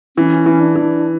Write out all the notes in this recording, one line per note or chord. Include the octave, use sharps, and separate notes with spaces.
E3 C#4
E3
D4
E3